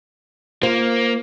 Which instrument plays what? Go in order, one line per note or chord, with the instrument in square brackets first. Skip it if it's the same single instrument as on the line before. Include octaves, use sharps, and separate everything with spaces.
[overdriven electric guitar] A#3 [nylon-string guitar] F4 C5